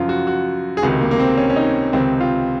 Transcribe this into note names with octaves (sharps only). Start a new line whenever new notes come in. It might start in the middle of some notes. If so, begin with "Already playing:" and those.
Already playing: F#2 C#3 F3 F4
F#4
F#4
G#4
C#2 C3 D#3 F#4
A#3
A#3
C4
C#4
C#4
D#4
C#2 C3 D#3 C4
F4